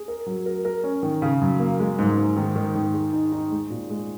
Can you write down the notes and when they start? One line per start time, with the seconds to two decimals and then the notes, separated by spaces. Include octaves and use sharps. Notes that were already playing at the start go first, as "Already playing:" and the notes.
Already playing: G#4
0.08 A#4
0.26 F#3
0.46 A#4
0.65 A#4
0.84 C#4
1.03 D#3
1.22 C#3
1.41 F#2
1.60 A#3
1.80 G#3
1.99 G#2
2.18 G#2
2.37 D#3
2.56 D#3
2.75 D#3
2.93 G#3
3.13 D#4
3.32 D#4
3.52 G#3
3.70 A#2
3.90 G#3